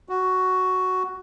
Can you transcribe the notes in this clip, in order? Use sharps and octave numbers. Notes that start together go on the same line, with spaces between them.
F#4